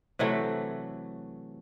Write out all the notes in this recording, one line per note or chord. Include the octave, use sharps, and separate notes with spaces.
C3 E3 F#3 A3